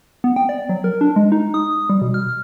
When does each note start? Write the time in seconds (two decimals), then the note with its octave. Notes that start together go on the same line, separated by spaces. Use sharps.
0.24 B3
0.36 G5
0.49 D5
0.69 F#3
0.84 A#4
1.01 D4
1.16 G#3
1.32 D#4
1.54 D#6
1.90 G3
2.02 B2
2.14 F6